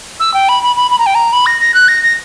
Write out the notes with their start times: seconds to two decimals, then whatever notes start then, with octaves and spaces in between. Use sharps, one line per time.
0.20 E6
0.34 G5
0.49 B5
0.63 B5
0.76 B5
0.91 B5
0.99 A#5
1.06 G5
1.15 A#5
1.33 B5
1.46 A#6
1.61 A#6
1.74 F#6
1.88 A#6
2.03 A#6